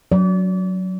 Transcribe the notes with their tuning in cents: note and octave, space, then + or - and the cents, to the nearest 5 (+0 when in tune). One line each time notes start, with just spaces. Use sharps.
F#3 +0 D5 -35